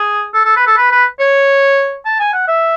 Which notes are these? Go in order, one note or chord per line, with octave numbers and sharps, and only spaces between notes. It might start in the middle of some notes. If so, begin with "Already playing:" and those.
Already playing: G#4
A4
A4
B4
A4
B4
B4
C#5
A5
G#5
F#5
E5